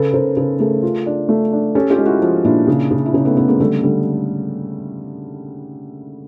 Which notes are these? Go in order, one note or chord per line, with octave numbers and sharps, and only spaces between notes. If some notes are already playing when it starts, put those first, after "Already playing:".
Already playing: C#3 A4 B4
C#3 A#4 C5
C#3 A4 B4
A3 G#4 A#4
F4
D4
A3
D4
C#4 G4 A4
F4 G4
G#3
E4 F#4
F3
A#2 D4 E4
C#3
C#3
E4
C#3 C#4 D#4
A3 B3
C#3 A3 B3
G#3 A#3
D3 G3 A3
D3 G3 A3